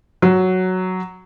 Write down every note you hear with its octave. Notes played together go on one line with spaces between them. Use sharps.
F#3